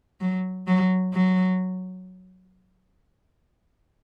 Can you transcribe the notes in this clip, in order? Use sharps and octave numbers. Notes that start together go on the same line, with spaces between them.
F#3
F#3
F#3